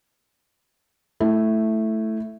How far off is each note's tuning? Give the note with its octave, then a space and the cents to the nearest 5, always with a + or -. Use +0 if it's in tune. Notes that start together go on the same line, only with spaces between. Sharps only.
A3 +0 E4 +0